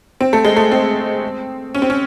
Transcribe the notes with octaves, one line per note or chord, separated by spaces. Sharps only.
C4
A3
G#3
A3
C4
C#4
C4
C#4